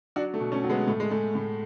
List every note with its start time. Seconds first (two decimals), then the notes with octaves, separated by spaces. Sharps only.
0.16 F#3 D4 F#4
0.34 A3
0.40 B2
0.52 A3 C#4
0.64 F#3
0.69 G#3 B3
0.87 A2 A3
1.00 G#3
1.11 G#3 A3
1.35 A2